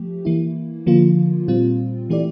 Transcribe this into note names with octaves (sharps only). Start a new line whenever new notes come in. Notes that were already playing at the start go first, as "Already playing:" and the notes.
Already playing: F3 A3 G4
E3 A#3 E4
D3 F3 A#3 F4
A#2 G3 C4 F4
E3 A3 E4 G4 D5